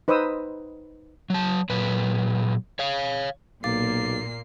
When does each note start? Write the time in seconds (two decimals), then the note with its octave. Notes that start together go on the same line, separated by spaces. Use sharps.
0.08 D#4 B4 C5 D#5 D#6 E6
1.30 F#3 A5
1.70 A#2 F#3 B4
2.79 C#5 F5
3.64 B1 A#2 A#3 F5 D6 A6 C7